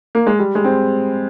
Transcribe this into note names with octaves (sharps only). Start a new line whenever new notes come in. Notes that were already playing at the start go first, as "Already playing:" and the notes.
A#3
G#3
G3
G#3
C4